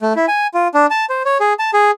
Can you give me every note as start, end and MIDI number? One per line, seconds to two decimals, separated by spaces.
0.01 0.13 57
0.16 0.26 64
0.28 0.47 80
0.54 0.68 65
0.74 0.86 62
0.91 1.05 81
1.10 1.23 72
1.25 1.38 73
1.40 1.53 68
1.59 1.71 81
1.74 1.91 68